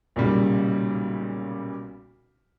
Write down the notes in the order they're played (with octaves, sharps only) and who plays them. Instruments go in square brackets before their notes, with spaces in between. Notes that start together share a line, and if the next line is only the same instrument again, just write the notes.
[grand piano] B1 A#2 C#3 G3